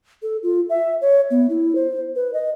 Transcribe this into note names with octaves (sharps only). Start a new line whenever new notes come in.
A4
F4
E5
C#5
B3
E4
C5
B4
D#5